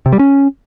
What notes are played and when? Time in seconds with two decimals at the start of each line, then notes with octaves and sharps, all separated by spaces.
0.06 C3
0.13 G3
0.19 C#4